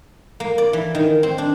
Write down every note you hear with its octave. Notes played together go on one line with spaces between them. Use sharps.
A#3
D5
E3
D#3
C4
D4